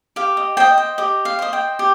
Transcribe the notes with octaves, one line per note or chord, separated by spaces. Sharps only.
G4 F5
D#5
C5 D#5 G5
G5
G4 D#5
F5
C5 D#5
G5
G4